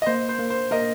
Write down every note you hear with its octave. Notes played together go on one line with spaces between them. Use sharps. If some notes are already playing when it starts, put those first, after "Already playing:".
D#5
A#3 C5
C5
A#3
C5
A#3 A#4 D#5